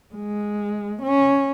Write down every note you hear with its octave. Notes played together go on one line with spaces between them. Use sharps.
G#3
C#4